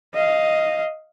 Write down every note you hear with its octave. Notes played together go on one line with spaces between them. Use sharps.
D#5 F5